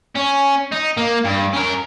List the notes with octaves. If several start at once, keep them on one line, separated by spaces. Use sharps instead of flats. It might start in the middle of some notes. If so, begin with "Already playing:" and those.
C#4
D#4
A#3
G2
C#4 A#4